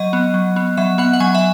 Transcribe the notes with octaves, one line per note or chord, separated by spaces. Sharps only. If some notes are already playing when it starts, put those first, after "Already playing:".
Already playing: F#3 D#5
B3
F#3
B3
F#3 E5
B3 F#5
F#5
F#3 G#5
E5